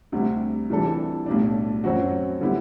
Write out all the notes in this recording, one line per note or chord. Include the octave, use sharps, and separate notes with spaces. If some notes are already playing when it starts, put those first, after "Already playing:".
D2 C3 G3
C3 E3 G3 D4 A4
B1 A2 G3 D4
F#2 F#3 C4 F#4
D3 G3 B3 E4